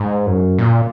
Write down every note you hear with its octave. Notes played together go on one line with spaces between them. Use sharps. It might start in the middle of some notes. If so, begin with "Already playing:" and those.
Already playing: G#2
F#2
A#2